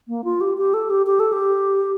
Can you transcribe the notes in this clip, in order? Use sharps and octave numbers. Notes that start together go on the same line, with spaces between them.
A#3
F4
G4
G4
A4
G4
G4
A4
G4